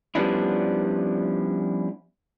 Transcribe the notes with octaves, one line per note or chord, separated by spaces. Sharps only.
F3 G3 B3 C#4 D4 E4